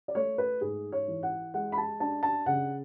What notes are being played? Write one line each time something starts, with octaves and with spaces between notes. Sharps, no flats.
D5
A3 C#5
B4
G#2 G#4
C#5
E3
F#5
G#3 F#5
B5
A5
D4 A5
A5
C#3 F#5